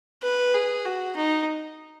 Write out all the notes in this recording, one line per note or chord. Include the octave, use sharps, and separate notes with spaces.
B4
G#4
F#4
D#4